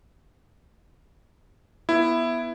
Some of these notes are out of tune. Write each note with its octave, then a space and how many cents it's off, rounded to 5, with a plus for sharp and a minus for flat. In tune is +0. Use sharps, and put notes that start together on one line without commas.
B3 -10 E4 +10